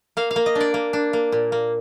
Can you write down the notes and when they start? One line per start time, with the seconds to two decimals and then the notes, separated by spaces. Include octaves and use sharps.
0.17 A#3 F5
0.31 F5
0.36 A#3
0.46 D#5
0.55 D4
0.60 D5
0.74 A#3
0.93 D4
1.13 A#3
1.32 A#2
1.52 A#3